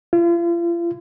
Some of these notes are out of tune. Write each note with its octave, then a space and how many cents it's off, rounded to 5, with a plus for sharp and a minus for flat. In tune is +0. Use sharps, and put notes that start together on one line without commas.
F4 -40